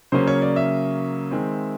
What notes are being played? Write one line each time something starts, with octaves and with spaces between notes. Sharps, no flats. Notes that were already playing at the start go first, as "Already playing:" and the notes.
C#3 F#3 A#3 C#4 C5
C#5
D5
E5
D#3 G#3 C4